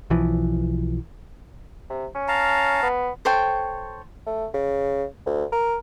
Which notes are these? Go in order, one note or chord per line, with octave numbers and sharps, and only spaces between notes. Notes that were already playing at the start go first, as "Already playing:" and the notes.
B1 E3 F3
C3
C#4
F5 A5 A#5
B3
A4 C5 C#5 G5
A3
C#3
D2
A#4